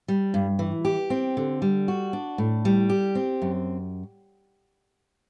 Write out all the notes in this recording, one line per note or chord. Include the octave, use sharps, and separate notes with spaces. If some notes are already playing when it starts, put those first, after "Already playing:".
G3
G2
E3
G4
C4
D3
G3
F#4
D4
A2
G3
G4
C4
F#2